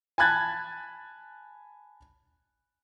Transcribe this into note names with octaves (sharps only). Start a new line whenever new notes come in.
G#5 A5 B5 F#6 G#6 A6